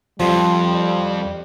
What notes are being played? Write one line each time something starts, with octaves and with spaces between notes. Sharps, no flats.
F2 F3 G3